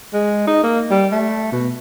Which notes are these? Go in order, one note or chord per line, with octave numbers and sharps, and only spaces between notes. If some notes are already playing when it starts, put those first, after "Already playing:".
G#3
D#4
A#3
G3
A3
B2